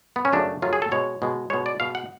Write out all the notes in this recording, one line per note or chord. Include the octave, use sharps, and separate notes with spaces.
B3
C#4
F#2 C#3 F#3 A3 D4
F#2 C#3 F#3 A3 F4
G#4
A4
B2 G#3 C#5
B2 G#3
B2 G#3 C#5
D5
B2 G#3 F5
F#5